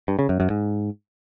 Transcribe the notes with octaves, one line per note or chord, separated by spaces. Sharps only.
G2
C#3
F#2
F#2
G#2